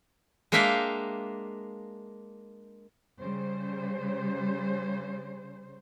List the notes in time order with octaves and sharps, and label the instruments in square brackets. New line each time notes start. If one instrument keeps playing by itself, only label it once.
[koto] G#3 A#3 D4 E5 F5 G5
[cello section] C#3 G3 C5